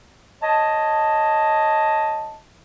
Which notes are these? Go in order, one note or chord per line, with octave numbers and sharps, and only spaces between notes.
C#5 D#5 A5